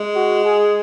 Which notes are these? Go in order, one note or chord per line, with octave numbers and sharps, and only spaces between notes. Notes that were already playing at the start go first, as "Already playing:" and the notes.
Already playing: G#3
F#4
G#4